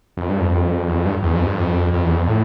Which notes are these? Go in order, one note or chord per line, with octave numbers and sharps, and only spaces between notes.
F2
G2
F2
E2
F2
G2
E2
F2
G2
F2
F2
E2
F2
A2